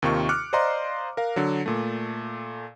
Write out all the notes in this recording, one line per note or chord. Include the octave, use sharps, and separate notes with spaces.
D#2 C3 D#3 F4 C#6
D6 F6 F#6 C#7
C5 D5 D#5 F5 A#5 C6
A#4 F5
D3 F#3
A#2 A3